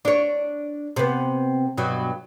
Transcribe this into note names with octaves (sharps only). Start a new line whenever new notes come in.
D4 C#5
C3 B3
G2 B2 F#3